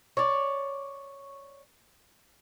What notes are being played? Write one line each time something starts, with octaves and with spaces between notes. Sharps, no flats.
C#5 D5